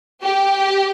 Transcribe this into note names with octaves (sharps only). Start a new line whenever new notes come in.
G4